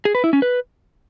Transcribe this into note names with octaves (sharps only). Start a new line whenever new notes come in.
G#4
B4
E4
C#4
B4